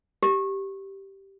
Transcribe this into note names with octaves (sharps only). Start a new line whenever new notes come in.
G4